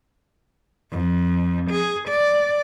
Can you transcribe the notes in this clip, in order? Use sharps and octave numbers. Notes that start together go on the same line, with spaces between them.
F2
G#4
D5